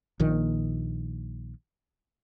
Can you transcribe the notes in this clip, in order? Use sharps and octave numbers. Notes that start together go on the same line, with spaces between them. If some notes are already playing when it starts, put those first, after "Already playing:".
A#1 A#2 D#3